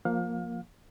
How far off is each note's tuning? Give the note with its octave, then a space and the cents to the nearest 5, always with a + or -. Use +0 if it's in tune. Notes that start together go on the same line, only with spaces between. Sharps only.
F3 +10 A#3 +0 F5 +30